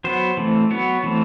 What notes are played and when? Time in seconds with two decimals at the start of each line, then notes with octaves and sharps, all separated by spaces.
0.04 F#3 B3 C5
0.37 E3 A3 C4
0.70 F#3 B3 C#5
1.04 E3 A3 C4